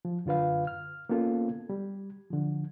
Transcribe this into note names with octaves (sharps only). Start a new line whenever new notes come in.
F3
F#2 D3 F4 B4 F5
F6
A#3 B3 C#4 F4 A4
G3
D3 F3